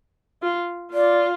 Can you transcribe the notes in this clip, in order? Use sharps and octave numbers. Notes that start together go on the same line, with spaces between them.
F4
F4 D5